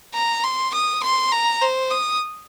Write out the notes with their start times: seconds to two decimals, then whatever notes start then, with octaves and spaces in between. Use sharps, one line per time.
0.14 A#5
0.44 C6
0.74 D#6
1.03 C6
1.32 A#5
1.61 C5
1.91 D#6